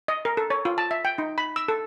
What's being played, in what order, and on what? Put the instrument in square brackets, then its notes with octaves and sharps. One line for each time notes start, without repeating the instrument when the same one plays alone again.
[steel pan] D#5
A#4
A4
C#5
F4
A5
E5
G5
D#4
B5
E6
A4